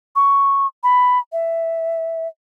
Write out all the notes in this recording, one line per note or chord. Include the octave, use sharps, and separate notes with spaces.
C#6
B5
E5